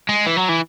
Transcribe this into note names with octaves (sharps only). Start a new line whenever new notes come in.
G#3
E3
F#3
E3